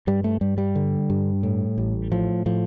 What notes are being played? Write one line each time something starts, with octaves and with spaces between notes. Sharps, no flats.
G2 G3
A3
G2 G3
G3
D3
G2
A2
A1
A2 F3
A2 F3